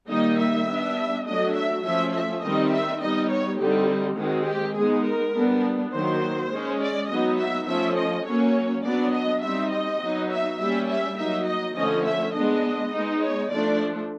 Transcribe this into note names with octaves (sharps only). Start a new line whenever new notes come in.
D#3 G3 A#3 D#4 D#5
E5
G3 B3 D4
F#3 A3 D4 D#5
E5
F3 A3 C#4 E5
E5
D#3 G3 C4 D#4 D#5
E5
G3 B3 D#4 D#5
C#5
D3 G3 C4 D#4 G4
D#3 G#3 C4 F#4
G4
G#3 B3 D#4 G#4
A#4
G3 B3 D4
D#3 F#3 A#3 C5
G#3
C#4
D5
F#3 B3 D#4 D#5
E5
F3 A3 C#4 E5
D#5
F#3 A#3 C#4 C#5
F#3 B3 D4 D5
D#5
G3 C4 D#4 E5
D#5
F#3 B3 D#4
E5
G3 A#3 C#4 E5
E5
F#3 A#3 D#4 E5
D#5
D3 F3 A3 C#4 D#5
E5
G#3 B3 D4 D#5
G#3 B3 D#4
C#5
F3 A3 D4 D5